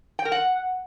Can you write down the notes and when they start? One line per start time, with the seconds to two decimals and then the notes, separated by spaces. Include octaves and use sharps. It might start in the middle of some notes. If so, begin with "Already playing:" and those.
0.19 G5
0.25 A#4
0.32 F#5